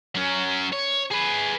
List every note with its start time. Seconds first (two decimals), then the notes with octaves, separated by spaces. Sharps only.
0.15 F#3 C#4
0.72 C#5
1.11 G#4 B4